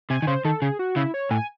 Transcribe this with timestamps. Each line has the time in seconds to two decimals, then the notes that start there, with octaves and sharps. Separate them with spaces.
0.10 C3 G#5
0.22 D#3
0.27 C#3 C5
0.45 D#3 A4
0.62 C#3 G#4
0.79 F#4
0.96 C#3 E4
1.14 C#5
1.31 A2 G#5